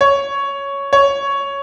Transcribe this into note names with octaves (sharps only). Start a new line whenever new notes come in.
C#5
C#5